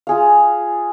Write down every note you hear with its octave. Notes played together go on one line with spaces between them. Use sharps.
F4 G#4 F5